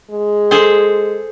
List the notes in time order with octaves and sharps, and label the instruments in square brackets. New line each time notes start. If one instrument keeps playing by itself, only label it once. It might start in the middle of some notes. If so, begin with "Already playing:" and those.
[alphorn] G#3
[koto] G#4 A4 C5